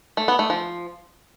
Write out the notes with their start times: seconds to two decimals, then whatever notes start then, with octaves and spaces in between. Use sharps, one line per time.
0.17 A3
0.28 B3
0.39 A3
0.50 F3